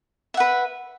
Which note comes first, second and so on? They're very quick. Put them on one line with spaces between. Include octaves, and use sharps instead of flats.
E5 F#5 B4